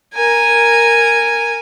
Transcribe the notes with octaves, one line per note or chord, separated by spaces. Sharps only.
A#4 G#5